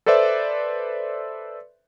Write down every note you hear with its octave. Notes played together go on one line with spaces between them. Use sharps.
A4 B4 C5 D5 E5